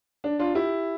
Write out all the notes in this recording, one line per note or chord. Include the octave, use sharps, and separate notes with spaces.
D4
D4 F4
E4 G4